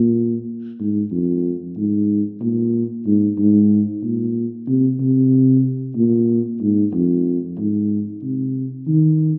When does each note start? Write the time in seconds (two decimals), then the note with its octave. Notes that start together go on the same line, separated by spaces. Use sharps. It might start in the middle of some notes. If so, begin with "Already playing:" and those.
Already playing: A#2
0.80 G#2
1.12 F2
1.77 G#2
2.41 A#2
3.06 G#2
3.39 G#2
4.03 A#2
4.68 C3
5.00 C3
5.96 A#2
6.62 G#2
6.94 F2
7.59 G#2
8.23 C3
8.88 D#3